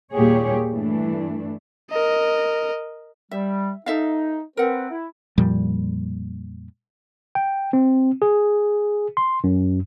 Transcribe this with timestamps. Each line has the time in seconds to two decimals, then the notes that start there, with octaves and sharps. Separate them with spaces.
0.12 D#2 A#2 G3 G4 G#4 C#5
0.69 G2 E3 A3 D4
1.91 A#4 D#5
3.31 G3 E5
3.86 D#4 A4 E5 F5
4.57 C4 A#4 B4 F#5
4.90 E4
5.38 F2 A#2 F3 G3
7.35 G5
7.73 C4
8.22 G#4
9.17 C6
9.44 F#2